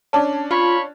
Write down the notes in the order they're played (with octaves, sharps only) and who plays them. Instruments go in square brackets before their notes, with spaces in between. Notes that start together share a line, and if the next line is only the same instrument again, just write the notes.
[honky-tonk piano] C#4 D4 [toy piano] A5 D6
[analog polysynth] F4 [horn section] C#5 B5